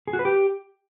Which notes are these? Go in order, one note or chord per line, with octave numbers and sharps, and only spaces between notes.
G#4
F#4
B4
G4